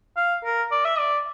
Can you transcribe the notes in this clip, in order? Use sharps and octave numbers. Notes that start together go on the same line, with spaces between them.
F5
A#4
D5
E5
D5